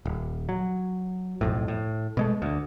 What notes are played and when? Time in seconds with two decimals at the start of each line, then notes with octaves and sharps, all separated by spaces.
0.06 D#1
0.49 F#3
1.41 B1 F2 A2
1.68 A2
2.17 B2 G#3 A3
2.42 D2